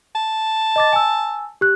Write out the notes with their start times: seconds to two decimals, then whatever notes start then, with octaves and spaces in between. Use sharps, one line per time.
0.15 A5
0.76 D#5 D6 A6
0.93 G#5 E6
1.61 G4 F#6